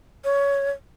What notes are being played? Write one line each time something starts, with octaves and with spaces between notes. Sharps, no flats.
C#5